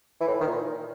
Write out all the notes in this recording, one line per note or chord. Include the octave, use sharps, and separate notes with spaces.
E3
A2
E3
D#3
A#2